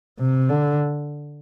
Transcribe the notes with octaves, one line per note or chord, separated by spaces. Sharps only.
C3
D3